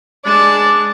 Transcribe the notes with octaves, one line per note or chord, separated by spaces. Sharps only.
G#3 D4 D5 A5